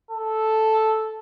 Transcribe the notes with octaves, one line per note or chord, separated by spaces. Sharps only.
A4